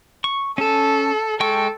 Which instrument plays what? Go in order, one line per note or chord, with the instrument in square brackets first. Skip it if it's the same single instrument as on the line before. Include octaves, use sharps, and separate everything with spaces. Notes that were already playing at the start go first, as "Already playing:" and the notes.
[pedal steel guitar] C#6
[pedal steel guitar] C#4 A5 [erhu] A4
[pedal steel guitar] G#3 G5 C#6 [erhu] A4